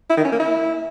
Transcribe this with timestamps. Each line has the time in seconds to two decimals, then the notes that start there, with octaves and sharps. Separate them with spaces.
0.10 E4
0.17 D#3
0.25 C#4
0.32 A#3
0.40 E4